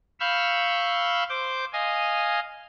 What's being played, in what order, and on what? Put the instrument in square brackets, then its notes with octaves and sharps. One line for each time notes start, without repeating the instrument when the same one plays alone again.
[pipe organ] F5 B5 C#6 E6 F6 G6
C5 D6 G6
D#5 F5 G#5